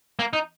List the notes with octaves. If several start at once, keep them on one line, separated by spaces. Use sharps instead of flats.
A#3
D#4